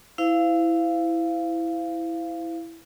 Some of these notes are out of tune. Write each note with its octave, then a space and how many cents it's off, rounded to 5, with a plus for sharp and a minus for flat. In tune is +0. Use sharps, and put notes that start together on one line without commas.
E4 +0 C5 -30 F5 -15